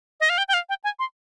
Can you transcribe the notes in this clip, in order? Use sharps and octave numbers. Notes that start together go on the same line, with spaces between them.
D#5
F5
G5
G5
F5
G5
G#5
C6